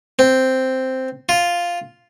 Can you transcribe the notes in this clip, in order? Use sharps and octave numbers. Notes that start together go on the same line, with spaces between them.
C4
F4